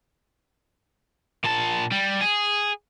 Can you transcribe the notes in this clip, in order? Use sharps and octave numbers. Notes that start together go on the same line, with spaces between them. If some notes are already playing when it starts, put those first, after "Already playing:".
A#2 A5
G3
G#4